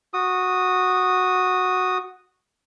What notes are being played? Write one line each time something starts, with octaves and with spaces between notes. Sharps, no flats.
F#4 D#6